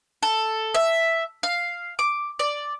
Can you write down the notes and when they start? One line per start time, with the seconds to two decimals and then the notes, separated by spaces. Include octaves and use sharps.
0.23 A4
0.74 E5
1.43 F5
1.99 D6
2.39 D5